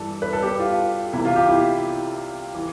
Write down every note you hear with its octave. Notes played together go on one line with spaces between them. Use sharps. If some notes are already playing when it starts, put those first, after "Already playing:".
Already playing: G2 E3 A4
B4
A4
G4
F4
C2 C3 E3 E4
F4
G4
E4
E3